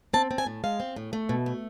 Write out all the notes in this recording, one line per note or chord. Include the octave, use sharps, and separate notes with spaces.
C4 A5
C4
G#5
A2
G#3 F5
C4
A2
A3
B2
A3